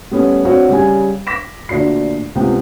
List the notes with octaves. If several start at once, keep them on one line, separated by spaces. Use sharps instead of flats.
G3 A3 B3 C#4
C4 D4 F#4 C#5 F5 F#5
C#3 G3 G#5
D6 A#6 B6 E7
D2 A#2 D4 F#4 C7
C#2 C3 B3 G5